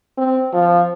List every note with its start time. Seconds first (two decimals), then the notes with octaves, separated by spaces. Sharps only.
0.17 C4
0.53 F3